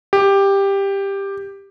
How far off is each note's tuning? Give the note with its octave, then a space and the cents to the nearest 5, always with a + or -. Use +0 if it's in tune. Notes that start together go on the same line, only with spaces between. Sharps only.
G4 +10